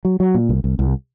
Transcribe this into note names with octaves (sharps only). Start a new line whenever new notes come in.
F#3
F#3
A#2
C2
C2
C2